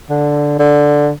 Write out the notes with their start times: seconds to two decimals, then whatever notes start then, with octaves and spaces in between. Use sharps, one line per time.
0.10 D3
0.59 D3